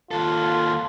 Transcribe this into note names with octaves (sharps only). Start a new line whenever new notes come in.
D#2 F4 A4